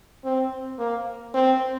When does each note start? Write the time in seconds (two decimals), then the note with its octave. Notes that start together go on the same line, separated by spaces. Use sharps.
0.24 C4
0.79 A#3
1.34 C4